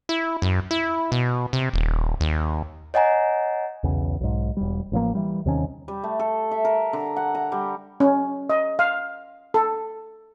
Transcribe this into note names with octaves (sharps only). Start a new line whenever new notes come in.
E4
F#2
E4
B2
C3
D#1
D#2
C#5 D#5 F#5 G#5 A#5
B1 E2 C#3
B1 G#2
E1 G3
A1 F3 F#3 A#3
E3 G3
D#2 C3 D#3 C#4
G3
A3
A4
E5
A#4
D3
F#5
A#5
G3
C#4
D#5
F5
A4